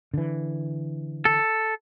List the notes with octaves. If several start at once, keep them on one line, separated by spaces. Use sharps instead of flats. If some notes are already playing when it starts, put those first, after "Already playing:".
D3 E3
A4